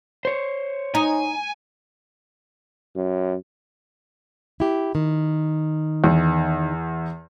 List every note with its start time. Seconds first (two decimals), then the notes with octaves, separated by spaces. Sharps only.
0.25 C5 C#5
0.95 D#4 G#5
2.96 F#2
4.60 E4 G4
4.95 D#3
6.04 E2